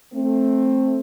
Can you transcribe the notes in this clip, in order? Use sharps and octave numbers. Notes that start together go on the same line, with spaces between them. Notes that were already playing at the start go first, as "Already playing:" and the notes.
A3 C4